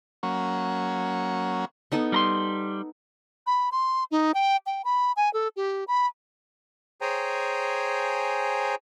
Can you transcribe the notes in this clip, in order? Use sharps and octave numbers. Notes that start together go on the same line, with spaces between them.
F#3 A#3 C#4
B3 D#4 A4
G3 A#5 C6
B5
C6
D#4
G5
G5
B5
G#5
A4
G4
B5
G#4 C5 C#5 G5 G#5 A#5